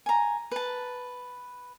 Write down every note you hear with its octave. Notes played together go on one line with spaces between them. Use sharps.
G#5 A#5
B4 A5